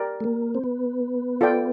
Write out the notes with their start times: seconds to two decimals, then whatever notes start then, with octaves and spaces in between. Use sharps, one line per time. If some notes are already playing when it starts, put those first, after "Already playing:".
Already playing: G4 A#4 D5
0.20 A3
0.24 A#3
0.55 C4
0.64 B3
1.41 F4 A4 D5 G5